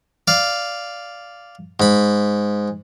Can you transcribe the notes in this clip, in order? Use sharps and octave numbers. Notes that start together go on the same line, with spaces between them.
D5 F5
G#2 B5